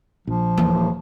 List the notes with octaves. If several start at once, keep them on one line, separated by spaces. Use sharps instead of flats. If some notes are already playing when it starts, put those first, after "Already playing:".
A#1 F3
D#1 D#3 E3 A#3